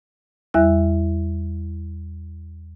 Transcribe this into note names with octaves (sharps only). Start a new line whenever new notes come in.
E2 G3 E4 E5 F#6